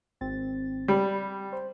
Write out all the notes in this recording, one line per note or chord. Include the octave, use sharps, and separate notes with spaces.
G#1 C4 A6
G3 B5
C5